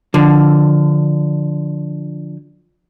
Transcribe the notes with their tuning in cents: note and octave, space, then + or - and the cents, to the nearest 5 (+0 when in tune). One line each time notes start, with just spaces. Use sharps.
D3 +0 F3 +5